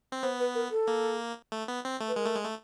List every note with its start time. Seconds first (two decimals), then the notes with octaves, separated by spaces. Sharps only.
0.12 C4
0.23 B3 C5
0.40 B4
0.55 A#4
0.71 A4
0.87 A#3
1.52 A3
1.68 B3
1.85 C4
2.00 A3
2.08 B4
2.16 G#3 A#4
2.26 A3
2.35 G#3
2.45 A3